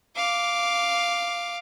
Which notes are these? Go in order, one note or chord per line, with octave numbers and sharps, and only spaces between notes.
F5 D6